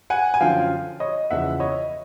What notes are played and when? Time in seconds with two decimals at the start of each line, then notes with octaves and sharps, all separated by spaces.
0.10 F#5 G#5
0.34 G#5
0.40 F#2 D3 F3 F5 G5
1.00 C#5 D#5
1.30 E2 C#3 F3 E5 F#5
1.60 C#5 D#5